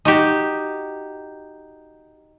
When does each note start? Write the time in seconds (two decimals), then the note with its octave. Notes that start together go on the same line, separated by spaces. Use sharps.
0.05 D#4 F#4 G4